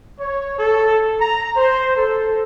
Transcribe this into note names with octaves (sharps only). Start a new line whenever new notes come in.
C#5
A4
A#5
C5
A4